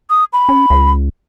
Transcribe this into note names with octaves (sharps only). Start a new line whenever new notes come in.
D#6
B5
C#4
C#2